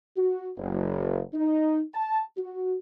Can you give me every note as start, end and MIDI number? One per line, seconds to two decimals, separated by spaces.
0.17 0.50 66
0.57 1.20 30
1.34 1.80 63
1.93 2.20 81
2.37 2.75 66